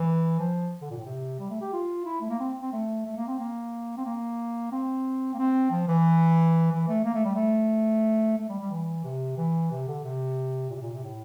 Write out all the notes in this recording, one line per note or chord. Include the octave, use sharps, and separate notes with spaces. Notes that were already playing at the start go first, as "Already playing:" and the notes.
Already playing: E3
F3
D3
A#2
A2
C3
G3
A3
G4
F4
E4
A3
A#3
C4
C4
A3
A3
A#3
C4
A#3
C4
A#3
C4
A#3
C4
F3
E3
E3
A3
A#3
A3
G3
A3
A3
G3
G3
E3
C3
E3
C3
D3
C3
A#2
C3
A#2
C3
A2